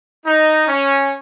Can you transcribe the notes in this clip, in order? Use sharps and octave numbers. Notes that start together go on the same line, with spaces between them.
D#4
C#4